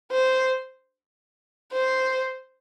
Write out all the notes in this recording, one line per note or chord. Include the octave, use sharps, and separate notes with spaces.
C5
C5